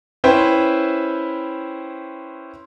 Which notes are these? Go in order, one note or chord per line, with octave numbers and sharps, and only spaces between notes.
C#4 E4 B4 C5 E5 G5